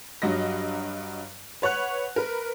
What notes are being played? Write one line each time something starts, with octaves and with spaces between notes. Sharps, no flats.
G2 F#3 D#5 A#6
B4 C#5 F#5 F#6
A#4 B4